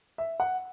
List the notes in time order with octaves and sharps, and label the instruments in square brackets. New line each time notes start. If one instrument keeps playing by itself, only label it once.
[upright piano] E5
F#5